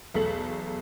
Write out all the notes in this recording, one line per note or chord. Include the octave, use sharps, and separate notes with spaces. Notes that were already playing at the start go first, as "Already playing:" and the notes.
B1 E2 A3 A4 B6 F#7